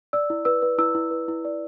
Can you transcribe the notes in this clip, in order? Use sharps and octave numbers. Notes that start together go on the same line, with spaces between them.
D5 E6
E4
B4 E6
B4
E4 E6
E4
B4
E4
D5